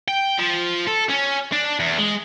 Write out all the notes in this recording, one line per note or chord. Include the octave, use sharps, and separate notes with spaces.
G5
F3
A4
C#4
D4
E2
G#3